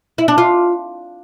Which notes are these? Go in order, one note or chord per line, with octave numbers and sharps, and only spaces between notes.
E4
D4
F4